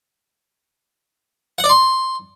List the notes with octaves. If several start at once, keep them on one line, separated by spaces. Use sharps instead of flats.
F#5
D5
C6